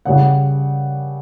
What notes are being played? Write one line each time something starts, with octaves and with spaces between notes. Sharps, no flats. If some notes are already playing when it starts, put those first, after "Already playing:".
C#3 G3 F#5